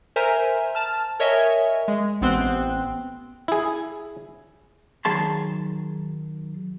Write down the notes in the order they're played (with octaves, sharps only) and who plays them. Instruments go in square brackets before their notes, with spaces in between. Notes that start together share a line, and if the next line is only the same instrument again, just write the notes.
[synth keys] A#4 C5 E5 G#5 A#5
A5 F6
A#4 C#5 D#5 E5 G#5
G#3
A1 B3 C4 C6 F#6
[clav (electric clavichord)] E4 G#4
[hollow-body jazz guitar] D#3 F#3 G#4 A5 C6